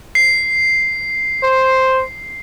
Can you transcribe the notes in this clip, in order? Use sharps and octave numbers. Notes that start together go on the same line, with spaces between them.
C7
C5